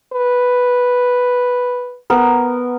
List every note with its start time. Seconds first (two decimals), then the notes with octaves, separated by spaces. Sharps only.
0.13 B4
2.10 B3 A#4